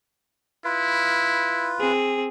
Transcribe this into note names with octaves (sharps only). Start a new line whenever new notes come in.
E4 F4 B4
C4 G#4